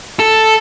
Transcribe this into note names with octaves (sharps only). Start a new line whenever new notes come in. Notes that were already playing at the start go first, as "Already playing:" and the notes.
A4